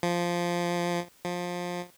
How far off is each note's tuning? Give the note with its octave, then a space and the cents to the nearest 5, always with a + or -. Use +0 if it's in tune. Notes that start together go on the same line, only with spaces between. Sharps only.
F3 -5
F3 +20